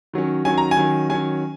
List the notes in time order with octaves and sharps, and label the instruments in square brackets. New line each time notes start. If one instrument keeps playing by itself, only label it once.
[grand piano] D#3 F#3 C#4
D#3 F#3 C#4 G#5
A#5
G#5
D#3 F#3 C#4
D#3 F#3 C#4 G#5